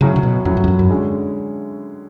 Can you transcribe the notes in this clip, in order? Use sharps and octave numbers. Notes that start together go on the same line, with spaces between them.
A2 C#3 F#3 C#4
C#3
B2
F2 A2 F#3 C#4
F#2
F2
F#2
F#2
D3 G#3 C#4